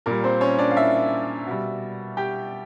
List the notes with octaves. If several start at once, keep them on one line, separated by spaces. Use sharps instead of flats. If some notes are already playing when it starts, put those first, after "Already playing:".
A#2 G3 A#3 A#4
C4 C5
C#4 C#5
D4 D5
F5
E4 E5
B2 G3
G4 G5